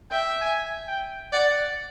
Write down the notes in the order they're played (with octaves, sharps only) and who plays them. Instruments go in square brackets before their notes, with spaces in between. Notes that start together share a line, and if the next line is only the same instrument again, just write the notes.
[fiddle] E5 [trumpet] G5
[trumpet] G#5
G5
[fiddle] D5 [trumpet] F#5